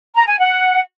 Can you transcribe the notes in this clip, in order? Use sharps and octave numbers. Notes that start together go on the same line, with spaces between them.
A#5
G#5
F#5